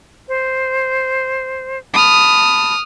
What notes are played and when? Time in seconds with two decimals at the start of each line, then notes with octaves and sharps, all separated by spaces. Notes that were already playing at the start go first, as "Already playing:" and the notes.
0.27 C5
1.94 A5 B5 D#6 F6